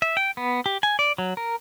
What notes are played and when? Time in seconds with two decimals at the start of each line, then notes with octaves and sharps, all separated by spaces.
0.02 E5
0.17 G5
0.37 B3
0.66 G4
0.83 G#5
0.99 D5
1.18 F#3
1.37 A#4